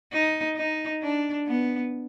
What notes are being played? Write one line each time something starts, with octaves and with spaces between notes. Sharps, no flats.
D#4
D#4
D4
B3